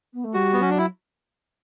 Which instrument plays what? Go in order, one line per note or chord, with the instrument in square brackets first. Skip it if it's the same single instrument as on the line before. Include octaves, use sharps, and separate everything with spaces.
[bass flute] B3
A3
[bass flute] G3 [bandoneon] F#4
[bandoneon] B3
[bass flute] F#3 [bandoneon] C#4
[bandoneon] D4
E4